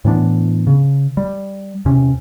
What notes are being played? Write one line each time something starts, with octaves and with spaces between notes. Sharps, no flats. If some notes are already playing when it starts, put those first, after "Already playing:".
A2 E3 B3 D4
C#3
G3
E2 C3 C#4